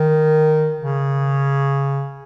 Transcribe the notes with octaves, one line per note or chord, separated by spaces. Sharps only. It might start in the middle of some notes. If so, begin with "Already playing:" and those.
Already playing: D#3
C#3